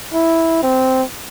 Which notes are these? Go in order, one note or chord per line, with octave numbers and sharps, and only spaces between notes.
E4
C4